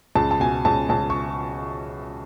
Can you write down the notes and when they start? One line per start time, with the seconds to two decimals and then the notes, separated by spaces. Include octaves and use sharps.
0.15 C#2 A5
0.31 A5
0.40 B2 G#5
0.65 C#2 A5
0.89 C#2 A5
1.10 C#6